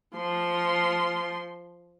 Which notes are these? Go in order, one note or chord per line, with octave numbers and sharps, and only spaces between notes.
F3 C6